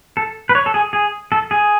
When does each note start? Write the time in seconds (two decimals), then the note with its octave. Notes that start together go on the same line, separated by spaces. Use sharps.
0.17 A4
0.49 B4
0.55 C#5
0.66 A4
0.74 G#4
0.93 G#4
1.32 A4
1.51 G#4